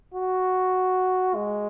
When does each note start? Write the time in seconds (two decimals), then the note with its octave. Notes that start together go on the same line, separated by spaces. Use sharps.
0.14 F#4
1.35 G#3